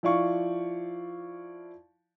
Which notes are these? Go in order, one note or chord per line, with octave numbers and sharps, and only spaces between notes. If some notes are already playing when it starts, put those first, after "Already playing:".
F3 E4 D5 F5 C#6